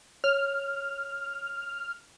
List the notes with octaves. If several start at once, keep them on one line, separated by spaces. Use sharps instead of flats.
C#5 F6